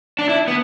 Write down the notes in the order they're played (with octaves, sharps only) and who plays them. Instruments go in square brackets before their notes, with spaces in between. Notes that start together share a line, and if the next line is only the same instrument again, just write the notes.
[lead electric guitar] D4
E4
B3